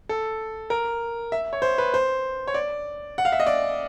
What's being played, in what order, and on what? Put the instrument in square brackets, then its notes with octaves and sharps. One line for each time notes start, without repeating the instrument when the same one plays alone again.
[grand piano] A4
A#4
E5
C#5
C5
B4
C5
C#5
D5
F#5
F5
E5
D#5
D5